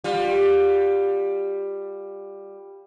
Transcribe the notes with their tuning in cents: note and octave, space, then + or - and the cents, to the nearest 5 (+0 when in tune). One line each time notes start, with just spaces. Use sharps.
G3 +10 F4 +30